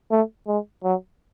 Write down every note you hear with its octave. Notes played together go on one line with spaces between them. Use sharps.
A3
G#3
F#3